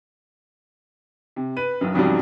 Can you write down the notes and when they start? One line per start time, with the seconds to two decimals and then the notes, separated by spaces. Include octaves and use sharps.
1.36 C3
1.57 B4 D#7
1.81 B1 F#2
1.94 B1 F2 G#2 C#3 F#3 G3